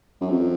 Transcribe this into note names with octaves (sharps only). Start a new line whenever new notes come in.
F#2
F2